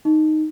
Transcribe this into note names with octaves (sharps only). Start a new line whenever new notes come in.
D#4